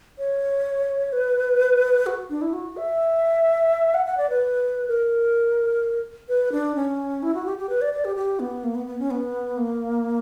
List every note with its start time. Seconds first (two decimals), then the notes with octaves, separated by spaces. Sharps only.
0.19 C#5
1.13 B4
2.06 F#4
2.30 D4
2.41 E4
2.53 F#4
2.77 E5
3.94 F#5
4.06 F#5
4.17 D5
4.30 B4
4.88 A#4
6.29 B4
6.52 D4
6.76 C#4
7.23 E4
7.35 F#4
7.46 G4
7.58 G4
7.69 B4
7.81 D5
7.93 D5
8.05 G4
8.16 G4
8.40 B3
8.64 A#3
8.75 B3
8.87 B3
8.99 C#4
9.11 B3
9.57 A#3